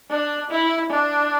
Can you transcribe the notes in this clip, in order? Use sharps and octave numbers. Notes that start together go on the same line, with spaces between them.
D4
E4
D4